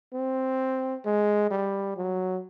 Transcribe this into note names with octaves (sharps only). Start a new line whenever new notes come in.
C4
G#3
G3
F#3